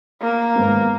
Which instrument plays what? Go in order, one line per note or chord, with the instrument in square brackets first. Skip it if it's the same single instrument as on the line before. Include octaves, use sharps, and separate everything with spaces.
[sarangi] A#3
[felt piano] G#1 B3